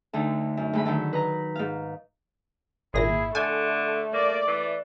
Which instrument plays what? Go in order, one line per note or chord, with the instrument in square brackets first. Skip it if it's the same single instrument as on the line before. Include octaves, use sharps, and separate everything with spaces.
[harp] D2 D3 D#4
F#2
D2 G#3 B5
D3 D#3 F#3
B4 D#5 A#5
G#2 F5
[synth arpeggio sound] G#1 A#2 A#6 [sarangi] E4 [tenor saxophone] G#4
[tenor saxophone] D3 [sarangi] A3 [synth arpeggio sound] G#5
[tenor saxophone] A#3 [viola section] D5
[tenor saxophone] E3